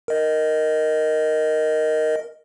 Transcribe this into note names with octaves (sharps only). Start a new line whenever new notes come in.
A#4 D#5